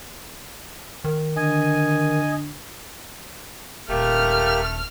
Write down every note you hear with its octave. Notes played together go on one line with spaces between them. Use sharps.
D#3
D3 D#5 G#5
D#1 A3 A#3 G4 F6